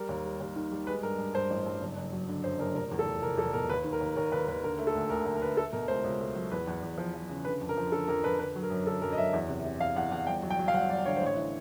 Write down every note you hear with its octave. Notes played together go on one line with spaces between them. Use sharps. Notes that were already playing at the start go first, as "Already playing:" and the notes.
Already playing: G3 A#4
D#2
G3
D#2
D#3
G3
G#3 B4
G2 A#4
G2
G2 C5
A1
G2
F#1
F#1
F#3
D3
F#2 C5
F#1 A#4
F1 A#4
E2
A4
F1
F1 A#4
E2 A4
B2 A#4
D#2 B4
D#3
A#4
D#2
D#2 A#4
D#2 B4
D#2 B4
D3 A#4
A3
A4
D2
D2 A#4
D2 A#4
A#4
D3 B4
A3 A4
B2 A#4
C#2 C5
C#2
A3
F#3
E2 B4
E2
E2
F3
F3
C#3
D3 B4
F2
A#4
F3
D3 A4
F2 A#4
F2 B4
D3 B4
F#3
A#4
F#2
D3 A4
F#2 A#4
D#5
F#2 E5
E2
C3
C3
E2 F5
E2 F#5
E2 F#5
G1 G5
F#3
G5
F#3
F5
G1 F#5
F#3 D5
D3 C#5
A1 C5
C#5
E3